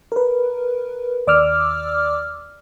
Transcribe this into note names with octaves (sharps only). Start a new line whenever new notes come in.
A#4 B4
D#2 D5 D6 E6 F6